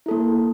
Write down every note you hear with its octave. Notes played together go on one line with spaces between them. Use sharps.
A#3 E4 A4